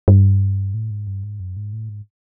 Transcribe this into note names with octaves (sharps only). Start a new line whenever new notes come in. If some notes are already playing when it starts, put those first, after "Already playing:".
G2
A2
G#2
G2
G#2
F#2
G#2
A2
G#2